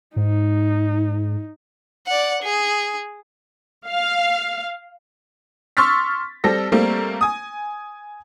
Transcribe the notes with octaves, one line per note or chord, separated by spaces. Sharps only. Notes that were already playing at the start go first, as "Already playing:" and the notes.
G#2 D#4
D5 F#5
G#4
F5
C6 C#6 E6 F6 A6 B6
G3 C4 A4 A#6
G3 A3 A#3 C4
G#5 D#6